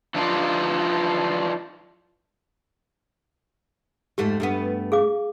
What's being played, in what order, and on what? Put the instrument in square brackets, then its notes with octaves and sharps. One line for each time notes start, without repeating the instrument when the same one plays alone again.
[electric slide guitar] E3 F3 D4 D#4 F4
[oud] F2 G#2 A3 [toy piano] G4
[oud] G2 A3 B3
[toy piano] G#4 F5 D6